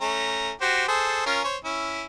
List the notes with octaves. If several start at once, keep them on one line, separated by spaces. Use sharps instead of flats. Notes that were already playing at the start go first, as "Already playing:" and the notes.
A3 C#4 A#5
F#4 G4 C5
G#4 A4 C5
C#4 F4 A#4
C5 C#5
C#4 E4